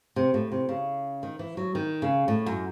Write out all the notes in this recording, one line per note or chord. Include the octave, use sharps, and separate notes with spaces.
C3
A2
C3
C#3
D#3
E3
F#3
D#3
C#3
A2
F#2